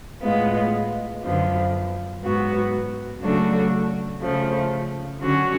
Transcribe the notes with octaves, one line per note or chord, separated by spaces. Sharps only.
A2 G#3 B3 F4
F#2 D3 F3 B3 F4
G#2 F#3 B3 F#4
C#3 F#3 A3 D4 F#4
C#3 F3 A3
D3 F#3 C#4 F#4